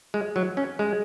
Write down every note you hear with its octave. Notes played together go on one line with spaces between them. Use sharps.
G#3
F#3
C#4
G#3